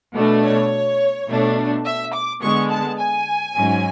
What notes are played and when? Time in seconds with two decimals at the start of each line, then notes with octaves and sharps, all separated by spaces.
0.14 B2 A3 D4
0.44 C#5
1.28 B2 A3 D4
1.85 E5
2.13 D6
2.42 D3 G#3 B3 C#6
2.71 A5
2.99 G#5
3.56 G#2 F#3 C#4